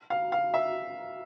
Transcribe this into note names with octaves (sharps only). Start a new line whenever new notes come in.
F5
F5
E5